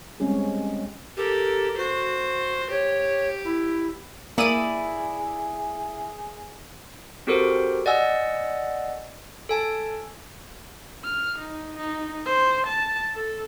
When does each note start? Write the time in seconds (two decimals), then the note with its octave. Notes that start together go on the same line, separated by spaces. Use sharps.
0.20 G3 G#3 C4 C#4 G#4
1.17 G4 A4 A#4
1.77 F#4 C5
2.70 G4 C#5
3.44 E4
4.38 A#3 E4 G#4 D5 D#6 D#7
7.27 C4 F#4 G4 A4 A#4 C5
7.86 D5 D#5 F#5 G#5 E6
9.49 A4 G#5 A5
11.04 F6
11.38 D#4
11.77 D#4
12.26 C5
12.66 A5
13.15 A4